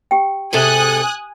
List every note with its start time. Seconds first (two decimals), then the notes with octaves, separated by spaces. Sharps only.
0.11 G4 G5
0.53 G#2 C3 A4 G#5 D#6 F#6